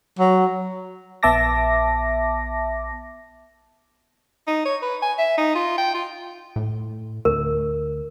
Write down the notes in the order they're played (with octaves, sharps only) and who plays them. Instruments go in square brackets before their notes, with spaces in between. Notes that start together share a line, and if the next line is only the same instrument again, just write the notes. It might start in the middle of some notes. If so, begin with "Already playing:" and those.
[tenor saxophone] F#3
[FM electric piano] A#1 B3 E5 A5 D6 A#6
[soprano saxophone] D#4
C#5
B4
G#5
E5
D#4
F4
G5
F4
[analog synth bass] A2
[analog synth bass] D2 [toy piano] A#4